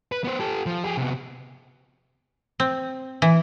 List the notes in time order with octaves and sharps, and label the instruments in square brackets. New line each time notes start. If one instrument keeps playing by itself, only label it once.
[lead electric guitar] B4
B3 C5
G4 A4
F3
G4 G#4
C3 B3
[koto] C4
E3